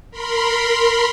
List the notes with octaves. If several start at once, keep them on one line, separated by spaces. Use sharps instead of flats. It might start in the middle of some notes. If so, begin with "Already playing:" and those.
A#4 B5 C6